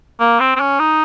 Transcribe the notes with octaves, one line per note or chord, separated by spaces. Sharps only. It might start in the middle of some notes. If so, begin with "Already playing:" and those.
A#3
C4
C4
C#4
D#4